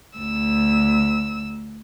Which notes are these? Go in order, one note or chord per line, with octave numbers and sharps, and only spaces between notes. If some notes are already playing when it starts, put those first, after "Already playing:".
D2 E6